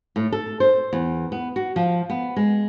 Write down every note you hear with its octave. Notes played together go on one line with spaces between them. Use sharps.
A2
A4
C5
E2
B3
F#4
F3
B3
G#3